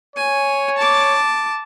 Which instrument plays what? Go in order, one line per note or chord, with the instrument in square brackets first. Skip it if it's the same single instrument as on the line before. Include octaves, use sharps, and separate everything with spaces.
[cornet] C#5 [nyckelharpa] G#5
[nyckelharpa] A5 D6